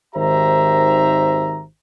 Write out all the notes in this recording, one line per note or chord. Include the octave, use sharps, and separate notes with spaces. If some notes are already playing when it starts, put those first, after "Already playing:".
G#1 D#3 G4 C5 E5 A#5